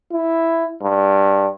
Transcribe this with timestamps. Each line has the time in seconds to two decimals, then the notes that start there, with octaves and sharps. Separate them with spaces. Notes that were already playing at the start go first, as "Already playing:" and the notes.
0.12 E4
0.82 G2